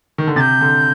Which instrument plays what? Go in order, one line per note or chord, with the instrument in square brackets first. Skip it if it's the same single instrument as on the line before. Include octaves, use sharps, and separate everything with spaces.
[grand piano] D#3
D3
[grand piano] C3 [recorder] G6 A6
[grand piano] D3